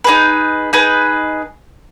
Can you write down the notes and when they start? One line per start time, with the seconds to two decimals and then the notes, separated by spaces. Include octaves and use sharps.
0.04 D#4 G#4 B4
0.73 D#4 G#4 B4